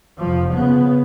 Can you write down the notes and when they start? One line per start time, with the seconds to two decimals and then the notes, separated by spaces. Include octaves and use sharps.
0.18 F1 F3
0.52 C#3 B3